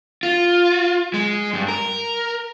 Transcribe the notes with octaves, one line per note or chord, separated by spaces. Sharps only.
F4
G#3
G2
A#4